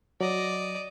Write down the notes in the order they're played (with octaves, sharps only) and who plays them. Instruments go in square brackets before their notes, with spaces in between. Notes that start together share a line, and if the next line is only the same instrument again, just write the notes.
[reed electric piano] F#3 [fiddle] D5 D#5